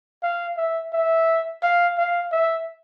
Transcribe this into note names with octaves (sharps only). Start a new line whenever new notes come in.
F5
E5
E5
F5
F5
E5